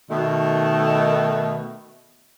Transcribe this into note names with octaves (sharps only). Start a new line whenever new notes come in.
B2 D#3 A3